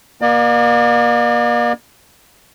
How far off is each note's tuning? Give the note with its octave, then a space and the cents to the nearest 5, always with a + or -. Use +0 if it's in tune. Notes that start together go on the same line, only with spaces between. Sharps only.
A#3 +30 D5 +45